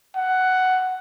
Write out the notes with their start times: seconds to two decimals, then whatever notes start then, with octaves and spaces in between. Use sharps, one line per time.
0.16 F#5